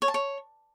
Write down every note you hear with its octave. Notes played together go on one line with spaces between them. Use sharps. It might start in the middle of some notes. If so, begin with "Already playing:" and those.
C#5
A5
C#5